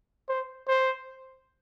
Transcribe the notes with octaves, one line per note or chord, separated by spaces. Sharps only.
C5
C5